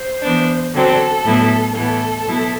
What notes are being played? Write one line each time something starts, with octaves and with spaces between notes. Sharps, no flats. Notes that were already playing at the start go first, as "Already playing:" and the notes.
Already playing: C5
E3 B3 D4
D3 F#3 C4 A4
A2 F#3 B3 E4
A2 E3 B3 A4
B2 F#3 B3 E4